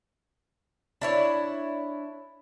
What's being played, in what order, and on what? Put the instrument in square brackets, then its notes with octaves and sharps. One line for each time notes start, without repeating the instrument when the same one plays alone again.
[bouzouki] D4 E4 C#5